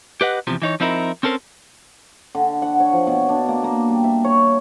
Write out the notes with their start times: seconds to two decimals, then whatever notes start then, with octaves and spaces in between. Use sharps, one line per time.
0.21 G4 B4 D#5 F#5
0.47 E2 C3 F3
0.62 E3 D#4 C#5
0.80 F3 C4 D#4 E4 A#4
1.23 C4 C#4 A4 A#4 C5
2.35 D3
2.62 F#5
2.80 C#5
2.93 F3
3.07 B2
3.29 D4
3.48 A#3
3.64 A#3
3.89 G3
4.04 E5
4.24 C#5